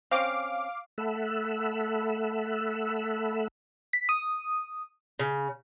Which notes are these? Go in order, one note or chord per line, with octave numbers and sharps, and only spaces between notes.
C4 C#4 F5 D6
A3 A4 E5 F#5 B5 E6
B6
D#6
C#3